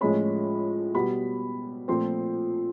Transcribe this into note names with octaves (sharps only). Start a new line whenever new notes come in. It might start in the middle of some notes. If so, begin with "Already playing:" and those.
A2 F3 G#3 C#4 B5
B2 G3 B3 B5
A#2 F3 A3 C4 C6